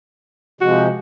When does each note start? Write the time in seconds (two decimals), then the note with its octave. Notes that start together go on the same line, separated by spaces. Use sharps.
0.61 C3 F3 G#3 F#4